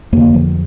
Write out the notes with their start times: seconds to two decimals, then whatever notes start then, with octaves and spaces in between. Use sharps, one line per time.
0.12 F2 D3 A#3
0.34 F3